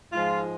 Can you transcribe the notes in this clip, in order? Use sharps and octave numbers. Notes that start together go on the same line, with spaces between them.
G#2 F3 G#3 F4